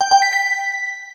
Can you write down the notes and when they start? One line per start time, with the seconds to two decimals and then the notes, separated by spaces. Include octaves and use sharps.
0.01 G5
0.11 G5
0.22 B6
0.33 B6